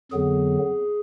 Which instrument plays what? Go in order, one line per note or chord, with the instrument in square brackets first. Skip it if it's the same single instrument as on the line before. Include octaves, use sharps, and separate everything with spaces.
[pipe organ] F2 D3 F#3 B3 G#4